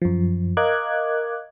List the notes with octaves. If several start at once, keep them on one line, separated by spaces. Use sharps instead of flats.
F#2 F3
A#4 D#5 F5 D6 F#6 G#6